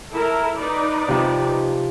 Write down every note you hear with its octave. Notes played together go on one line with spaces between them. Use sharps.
E4 A4 A#4
D#4 B4 D5
C3 F3